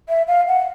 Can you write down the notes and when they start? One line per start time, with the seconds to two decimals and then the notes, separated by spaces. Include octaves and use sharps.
0.09 E5
0.28 F5
0.48 F#5